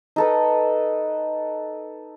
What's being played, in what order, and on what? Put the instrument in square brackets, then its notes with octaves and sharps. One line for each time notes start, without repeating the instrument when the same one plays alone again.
[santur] D#4 A4 B4